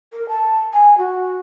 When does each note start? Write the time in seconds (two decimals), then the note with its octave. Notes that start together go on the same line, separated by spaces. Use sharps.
0.13 A#4
0.29 A5
0.73 G#5
0.98 F#4